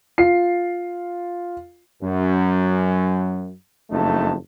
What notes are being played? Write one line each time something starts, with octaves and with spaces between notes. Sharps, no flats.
F4 C7
F#2
F#1 F2 A3 D#4 A5